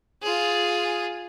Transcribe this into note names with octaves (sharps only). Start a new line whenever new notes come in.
F4 G#4